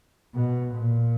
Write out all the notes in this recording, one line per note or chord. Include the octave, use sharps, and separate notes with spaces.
B2
A#2